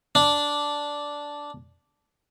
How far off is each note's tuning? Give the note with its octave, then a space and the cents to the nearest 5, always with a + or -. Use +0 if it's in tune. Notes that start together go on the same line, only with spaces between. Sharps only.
D4 -5